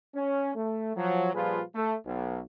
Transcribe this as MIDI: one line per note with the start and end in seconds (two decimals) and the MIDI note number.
0.15 0.51 61
0.55 0.93 57
0.96 1.29 53
0.96 1.29 54
1.35 1.61 46
1.35 1.61 53
1.35 1.61 55
1.35 1.61 65
1.35 1.61 68
1.35 1.61 71
1.75 1.94 57
2.05 2.40 35